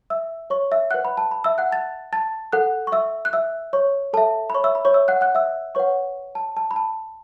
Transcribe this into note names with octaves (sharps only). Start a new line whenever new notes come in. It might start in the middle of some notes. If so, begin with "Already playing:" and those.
E5 E6
C#5 C#6
E5 E6
B4 F#5 F#6
B5
A5
B5
E5 E6
F#5 F#6
A5 A6
A5 A6
A4 F#5 F#6
C#6
E5 E6
F#6
E5 E6
C#5 C#6
A4 E5 A5
B5
C#5 C#6
E5 E6
B5
C#5 C#6
E5 E6
F#5 F#6
F#5 F#6
E5 E6
B4 C#5 F#5 C#6
A5
A5
B5
A5